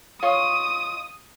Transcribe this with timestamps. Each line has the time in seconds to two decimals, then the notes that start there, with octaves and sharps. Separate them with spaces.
0.23 F4 C#5 D#5 D#6